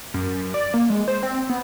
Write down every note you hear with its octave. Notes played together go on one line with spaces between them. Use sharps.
F#2
D5
A#3
G#3
C5
C4
B3